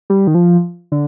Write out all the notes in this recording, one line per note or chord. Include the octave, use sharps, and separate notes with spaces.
G3
D#3
F3
D3